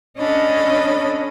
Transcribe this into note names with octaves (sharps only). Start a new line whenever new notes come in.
C#4 D4 A4 D#5 B5